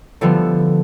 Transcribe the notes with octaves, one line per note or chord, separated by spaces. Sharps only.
D3 F3 G3 A3 B3